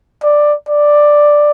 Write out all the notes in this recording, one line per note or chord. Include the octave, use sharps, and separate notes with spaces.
D5
D5